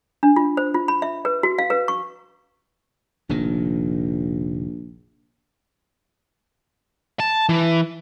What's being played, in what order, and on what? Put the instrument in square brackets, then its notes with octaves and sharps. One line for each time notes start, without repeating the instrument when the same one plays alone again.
[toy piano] D4
F4
C5
F4
B5
E5
B4
F#4
F5
B4
C#6
[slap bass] F1 A#2 D#3 [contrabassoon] A#1
[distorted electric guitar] A5
E3